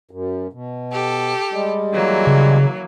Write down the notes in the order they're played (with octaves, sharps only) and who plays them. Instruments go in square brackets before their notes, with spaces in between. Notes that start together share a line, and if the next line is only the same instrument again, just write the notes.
[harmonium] F#2
B2
[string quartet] G4 A4
[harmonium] G3 G#3
[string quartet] E3 F#3 A#3
[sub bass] C#3